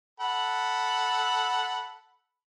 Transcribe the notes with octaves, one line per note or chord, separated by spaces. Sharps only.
A4 F#5 B5